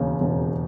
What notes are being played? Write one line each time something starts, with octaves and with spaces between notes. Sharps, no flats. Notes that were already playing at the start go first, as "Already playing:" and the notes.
Already playing: E1 D#2 C#3
E1